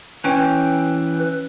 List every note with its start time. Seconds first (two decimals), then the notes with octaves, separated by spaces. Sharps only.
0.24 E3 C#4 B4 G5